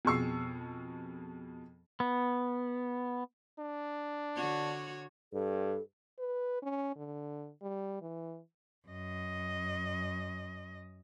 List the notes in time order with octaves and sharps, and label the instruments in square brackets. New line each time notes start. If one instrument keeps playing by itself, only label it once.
[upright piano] F2 B2 G#4 C#6 E6 C7
[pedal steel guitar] B3
[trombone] D4
[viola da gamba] D3 F#4 C#5
[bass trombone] G2 [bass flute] A4
[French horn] B4
C#4
D3
G3
E3
[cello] F#2 D#5